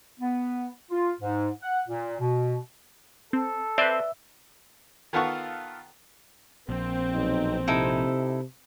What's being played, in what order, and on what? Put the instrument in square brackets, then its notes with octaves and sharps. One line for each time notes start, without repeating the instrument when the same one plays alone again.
[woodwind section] B3
F4
G#2
F#5
A#2
B2
[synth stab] C4 [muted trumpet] A4
[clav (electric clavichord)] C4 C5 [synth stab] B4 D5 [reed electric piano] E5 E6
[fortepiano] D#3 B3 F4 A4 F#5 C#6
[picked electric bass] A#1 [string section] C4
[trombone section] B1 D#4
[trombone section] C3 [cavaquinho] D#4 E4 A4